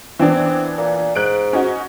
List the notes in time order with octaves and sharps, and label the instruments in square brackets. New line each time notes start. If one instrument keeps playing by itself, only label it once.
[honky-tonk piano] E3 B3 D4 [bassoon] C4
[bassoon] A#2
[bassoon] G#2 [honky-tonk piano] F#6 D7
[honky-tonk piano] C#4 D#4 F#4